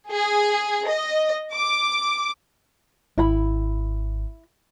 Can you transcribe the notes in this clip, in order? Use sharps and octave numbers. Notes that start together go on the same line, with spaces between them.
G#4
D#5
D6
G#1 E4 B5